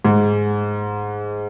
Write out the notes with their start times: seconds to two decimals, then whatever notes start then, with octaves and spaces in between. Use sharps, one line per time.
0.05 G#2